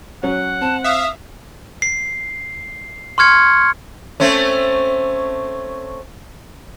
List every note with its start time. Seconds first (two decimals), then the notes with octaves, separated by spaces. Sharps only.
0.23 F#3 C#4 F#5
0.61 C4 A5
0.84 E5 F5 D#6
1.82 C7
3.18 C6 C#6 F6 G#6 C#7
4.20 A3 C4 C#4